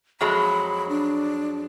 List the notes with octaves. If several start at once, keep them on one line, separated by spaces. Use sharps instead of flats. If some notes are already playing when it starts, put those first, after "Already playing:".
F2 F#3 G#3 B5
D4